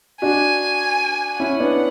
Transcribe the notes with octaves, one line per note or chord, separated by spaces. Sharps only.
D4 F#4 G#5
C#4 E4 F#5
B3 D4